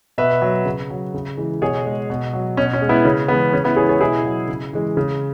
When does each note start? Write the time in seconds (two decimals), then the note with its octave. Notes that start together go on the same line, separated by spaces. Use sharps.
0.18 B2 B4 E5
0.42 F#3
0.65 C#3
0.90 F#3
1.14 C#3
1.37 E3 G#3
1.62 B2 G#4 C#5
1.86 G#3
2.10 B2
2.33 F#3
2.57 B2 C#4
2.73 C#4
2.82 G#3
2.89 B3 E4
3.05 C#3 C#4
3.28 E3 G#3 B3
3.53 C#3 C#4
3.64 B3 E4
3.76 E3 G#3 G#4 C#5
3.89 G#4 C#5
4.00 B2 E4 G#4
4.25 F#3
4.48 C#3
4.73 E3 G#3
4.97 C#3